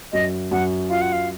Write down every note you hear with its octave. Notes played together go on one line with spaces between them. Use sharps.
F#2 D#5
F#2 F#5
F4 F5
F#5
F5